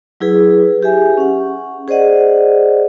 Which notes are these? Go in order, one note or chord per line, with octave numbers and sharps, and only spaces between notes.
F#3 E4 G#4 B4
G4 G#4 E5 G#5
C#4 F#5
G#4 C5 D5 D#5 F#5